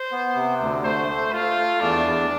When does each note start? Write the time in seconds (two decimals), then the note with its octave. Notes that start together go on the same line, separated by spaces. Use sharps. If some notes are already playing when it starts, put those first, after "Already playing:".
Already playing: C5
0.12 B3
0.36 C3
0.60 D2
0.84 A3 C5
1.08 A3
1.33 A3 F4
1.57 A3
1.81 E2 D4
2.05 E2